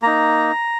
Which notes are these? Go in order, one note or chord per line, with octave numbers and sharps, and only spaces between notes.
A#3 D#4 A#5